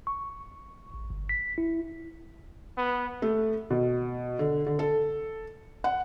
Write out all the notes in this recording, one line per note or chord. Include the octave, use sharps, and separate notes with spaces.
C#6
A1
G1
B6
E4
B3
A3
B2
D3
D3
A4
F#5